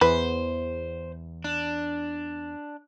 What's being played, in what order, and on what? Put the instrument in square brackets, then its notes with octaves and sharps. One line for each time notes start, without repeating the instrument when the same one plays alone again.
[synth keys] E2 [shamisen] B4 [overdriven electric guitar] C5
[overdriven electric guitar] D4